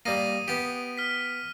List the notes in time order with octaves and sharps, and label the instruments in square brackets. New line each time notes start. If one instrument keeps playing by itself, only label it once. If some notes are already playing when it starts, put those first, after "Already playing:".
[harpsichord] G3 A#3 [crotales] D#6 A#6 D#7
[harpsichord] B3 G4
[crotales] F6 B6